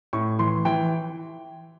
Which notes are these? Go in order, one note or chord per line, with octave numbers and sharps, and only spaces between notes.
A2 C#6
E3 C6
E3 G5